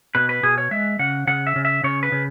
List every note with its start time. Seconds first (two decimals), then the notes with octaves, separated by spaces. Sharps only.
0.15 B2 B4
0.29 B4
0.43 B2 G#4
0.58 C#5
0.71 G#3 E5
0.99 C#3 F#5
1.27 C#3 F#5
1.47 E5
1.56 C#3
1.65 E5
1.84 C#3 C#5
2.03 B4
2.12 C#3